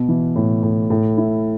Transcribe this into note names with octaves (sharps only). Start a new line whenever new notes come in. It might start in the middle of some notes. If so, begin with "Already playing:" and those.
Already playing: B2 B3
E3
A2
A2
A2
E4